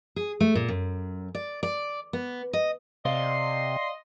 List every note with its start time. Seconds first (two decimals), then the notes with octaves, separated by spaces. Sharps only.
0.16 G#4
0.40 A3
0.55 A#2
0.68 F#2
1.35 D5
1.63 D5
2.13 B3
2.53 D#5
3.05 C3 D5 D#5 F5 F#5 C6